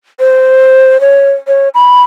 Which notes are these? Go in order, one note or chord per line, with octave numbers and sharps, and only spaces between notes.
C5
C#5
C#5
B5